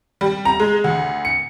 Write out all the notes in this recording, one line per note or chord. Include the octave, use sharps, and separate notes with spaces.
G3
A#5
G#3
D2
C#7